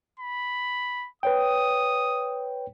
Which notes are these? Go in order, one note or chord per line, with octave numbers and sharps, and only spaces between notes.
B5
B4 C#5 G5 D#6